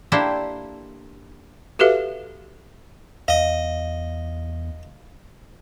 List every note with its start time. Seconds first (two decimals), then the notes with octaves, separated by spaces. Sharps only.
0.12 A#3 D4 E4 G4 A4 C5
1.79 F#4 G4 A4 B4 E5 F5
3.28 E2 D#5 F5